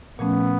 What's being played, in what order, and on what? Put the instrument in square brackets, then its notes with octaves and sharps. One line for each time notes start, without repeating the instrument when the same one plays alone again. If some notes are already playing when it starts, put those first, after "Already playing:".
[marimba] A#2 F3 A3 C#4 [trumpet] B3